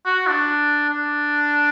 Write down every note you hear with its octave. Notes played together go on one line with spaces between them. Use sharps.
F#4
D4
D4